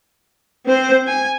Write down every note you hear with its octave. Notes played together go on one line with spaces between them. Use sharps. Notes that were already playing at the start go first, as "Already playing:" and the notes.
C4 C5
G#5